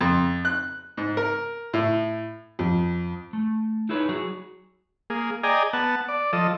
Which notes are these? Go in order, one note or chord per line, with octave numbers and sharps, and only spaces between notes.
F2
F#6
G#2
A#4
A2
F2
A3
D#4 E4 G#4 B4 C#5
F#3 F#4 G#4
A#3 G#4
G#4 D5 D#5 G5 G#5 A#5
B3 F#5 A5
D5
F3 A4 D#5